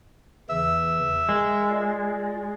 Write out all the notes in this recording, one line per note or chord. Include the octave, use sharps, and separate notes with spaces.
E2 C#3 E3 E5
G#3 A#4
F4 D5